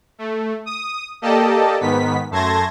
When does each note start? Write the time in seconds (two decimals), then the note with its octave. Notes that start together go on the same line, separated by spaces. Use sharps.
0.18 A3
0.66 D#6
1.22 A#3 G4 A4 D5 D#5 A5
1.81 G#2 D#3 B3 B6
2.31 F#2 A3 A5 C6 G#6 A#6